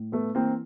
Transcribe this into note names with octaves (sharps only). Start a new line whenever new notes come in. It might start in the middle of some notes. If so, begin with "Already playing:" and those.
Already playing: A2
A3 B3
E3 A#3 C4